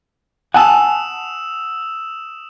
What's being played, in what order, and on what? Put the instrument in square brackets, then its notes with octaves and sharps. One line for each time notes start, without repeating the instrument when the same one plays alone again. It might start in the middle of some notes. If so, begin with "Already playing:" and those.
[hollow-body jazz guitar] F#5 G#5 A5 [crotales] D#6 E6 E7